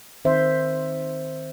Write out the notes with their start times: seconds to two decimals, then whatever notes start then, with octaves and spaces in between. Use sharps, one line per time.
0.25 D#3 C4 C5 E5